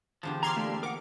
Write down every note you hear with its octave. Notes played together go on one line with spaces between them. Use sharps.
E2 D3 F3 G4
A#5 C6 D6 F6 G#6
A3 A#3 D4 G4 E5 G5
A#4 F#5 D6